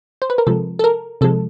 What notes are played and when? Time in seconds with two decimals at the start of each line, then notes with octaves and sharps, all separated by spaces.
0.22 C5
0.30 B4
0.38 A#4
0.47 C3 F3 G#3 A4
0.79 A4
0.84 A#4
1.21 C3 F3 G#3 A4